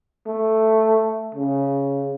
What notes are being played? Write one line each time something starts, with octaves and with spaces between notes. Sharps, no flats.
A3
C#3